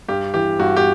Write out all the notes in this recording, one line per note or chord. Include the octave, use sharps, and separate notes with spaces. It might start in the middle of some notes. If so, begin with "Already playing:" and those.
G2 G4
E3 G4
G2 F#4
G4